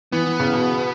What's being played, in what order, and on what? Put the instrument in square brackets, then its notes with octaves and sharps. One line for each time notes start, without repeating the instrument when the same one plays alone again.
[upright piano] E3 [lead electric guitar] B3
[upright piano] E3
C#3
B2